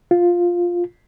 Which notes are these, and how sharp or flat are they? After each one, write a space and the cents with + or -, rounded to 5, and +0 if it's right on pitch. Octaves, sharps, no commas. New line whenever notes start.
F4 +5